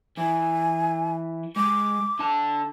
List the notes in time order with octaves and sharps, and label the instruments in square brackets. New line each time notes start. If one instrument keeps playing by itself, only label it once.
[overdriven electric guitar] E3 [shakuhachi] G#5
[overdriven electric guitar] G#3 [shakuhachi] D6
[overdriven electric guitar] D3 A5